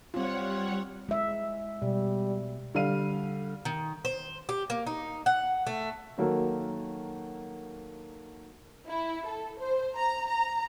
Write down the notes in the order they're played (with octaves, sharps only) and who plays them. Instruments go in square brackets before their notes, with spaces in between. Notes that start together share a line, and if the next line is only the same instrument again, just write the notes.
[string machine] G3 C#5 F#5 [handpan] C4 F4
[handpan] G#3 E5
[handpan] B2 [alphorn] G3
[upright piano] D3 G3 F5 D#7
[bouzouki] D#3
C5
G4
A#3
D#4
F#5
A3
[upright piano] D#3 F#3 A#3 F#4 A4 A#4
[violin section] E4
A4
C5
A#5
A#5